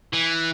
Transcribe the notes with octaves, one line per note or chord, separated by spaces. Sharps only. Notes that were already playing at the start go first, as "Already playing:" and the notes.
E3